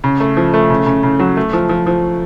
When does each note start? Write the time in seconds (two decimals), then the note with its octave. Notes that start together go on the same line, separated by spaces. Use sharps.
0.04 C#3
0.20 A3
0.37 F3
0.54 A3
0.70 C#3
0.86 C#3
1.03 C#3
1.19 F#3
1.37 A3
1.53 F3
1.69 F3
1.87 F3